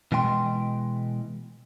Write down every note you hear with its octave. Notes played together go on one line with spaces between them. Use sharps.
B2 E3 G#3 G5 C6